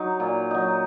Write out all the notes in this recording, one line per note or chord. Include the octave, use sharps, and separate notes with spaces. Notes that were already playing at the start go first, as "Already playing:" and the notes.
Already playing: F#3 D#4
A#2
F#3 D#4